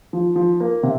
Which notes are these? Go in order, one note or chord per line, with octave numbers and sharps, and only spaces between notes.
F3
F3
A#3
C3